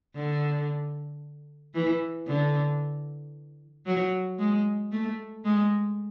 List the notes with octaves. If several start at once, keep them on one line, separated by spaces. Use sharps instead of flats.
D3
E3
D3
F#3
G#3
A3
G#3